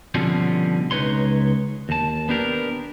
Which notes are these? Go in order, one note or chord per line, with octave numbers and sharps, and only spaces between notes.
B2 D3 F3 G3 C4 C#4
C#2 D#4 B4 C#5 C6
D#2 A5
B3 D4 G4 A#4